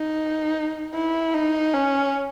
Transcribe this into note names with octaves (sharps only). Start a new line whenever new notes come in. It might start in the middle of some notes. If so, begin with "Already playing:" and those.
Already playing: D#4
E4
D#4
C#4